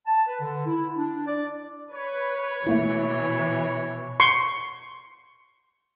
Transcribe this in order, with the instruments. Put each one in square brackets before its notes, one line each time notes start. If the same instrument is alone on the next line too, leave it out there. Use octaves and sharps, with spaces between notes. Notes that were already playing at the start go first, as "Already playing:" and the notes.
[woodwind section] A5
B4
D3
E4
D4
D5
[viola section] B4 [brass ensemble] C#5
[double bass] B2 [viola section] E3 [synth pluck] A3 A#3 E4
[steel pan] C6 C#6